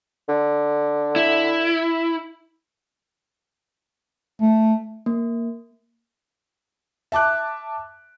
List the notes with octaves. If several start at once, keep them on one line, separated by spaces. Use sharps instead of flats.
D3
E4
A3
A#3
E5 A5 D6 F#6